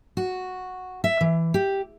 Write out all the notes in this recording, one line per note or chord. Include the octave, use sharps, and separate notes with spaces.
F#4
E5
E3
G4